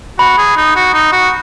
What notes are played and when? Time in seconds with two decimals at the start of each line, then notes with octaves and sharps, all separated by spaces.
0.19 F#4 B5
0.38 G#4
0.57 D#4
0.76 F#4
0.94 D#4
1.12 F#4